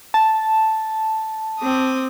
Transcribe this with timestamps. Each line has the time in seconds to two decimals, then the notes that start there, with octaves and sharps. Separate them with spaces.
0.14 A5
1.60 C4 D6 D#6